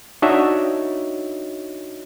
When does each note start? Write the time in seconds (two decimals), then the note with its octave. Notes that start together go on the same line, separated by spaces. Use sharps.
0.22 D4 D#4 F#4 C#5 D#5 E5